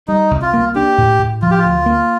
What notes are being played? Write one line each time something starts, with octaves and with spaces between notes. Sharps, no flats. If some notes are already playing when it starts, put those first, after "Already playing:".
G3 D#4
C2
F4
A#3
D4 G4
A2
A2
F3 F4
G4
F4
D2
A#3